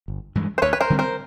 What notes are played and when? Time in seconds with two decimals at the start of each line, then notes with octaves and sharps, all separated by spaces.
0.08 G1
0.35 G2 E3 G#3
0.58 C5
0.62 D2 B4 C#5
0.73 B4
0.81 A#4 C5
0.90 D3 G3 C4
0.99 A#4 C5